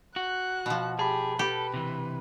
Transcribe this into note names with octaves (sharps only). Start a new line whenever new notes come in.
F#4 F#6
B2 F3
G4 G#4 A5 B5
G4 A4 B4
C3 E3